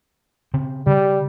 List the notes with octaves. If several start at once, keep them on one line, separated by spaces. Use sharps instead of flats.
C#3 C4
C#3 G3